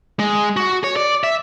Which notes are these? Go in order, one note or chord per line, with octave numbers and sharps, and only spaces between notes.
G#3
F#4
C#5
D5
E5